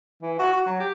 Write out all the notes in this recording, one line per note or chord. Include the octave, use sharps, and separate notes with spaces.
E3
F#4
F#4
F#3
G4